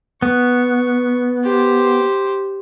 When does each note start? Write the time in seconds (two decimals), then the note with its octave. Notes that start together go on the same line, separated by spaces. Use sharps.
0.22 B3 C#6
1.44 G4 C5